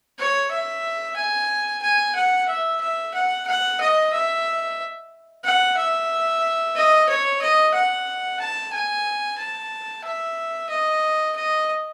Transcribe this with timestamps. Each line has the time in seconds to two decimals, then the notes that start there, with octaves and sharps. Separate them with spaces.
0.19 C#5
0.51 E5
1.17 G#5
1.83 G#5
2.15 F#5
2.48 E5
2.81 E5
3.14 F#5
3.47 F#5
3.81 D#5
4.13 E5
5.44 F#5
5.77 E5
6.75 D#5
7.09 C#5
7.41 D#5
7.74 F#5
8.39 A5
8.73 G#5
9.38 A5
10.04 E5
10.69 D#5
11.36 D#5